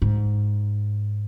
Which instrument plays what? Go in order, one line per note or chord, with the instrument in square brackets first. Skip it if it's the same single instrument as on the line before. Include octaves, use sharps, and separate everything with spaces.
[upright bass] G#2